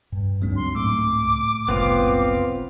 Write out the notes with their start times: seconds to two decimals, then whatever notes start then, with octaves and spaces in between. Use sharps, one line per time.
0.12 G2
0.42 C#2 G#2 F#3 G#3 C4 D4
0.56 C6
0.75 A2 A3 D6 E6
1.68 F#1 C2 B3 C4 F4